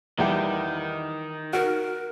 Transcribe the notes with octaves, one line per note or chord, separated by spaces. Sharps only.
E2 D#3 G3 G4
F#4 A#4